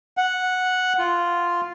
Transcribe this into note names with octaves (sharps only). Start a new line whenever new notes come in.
F#5
F4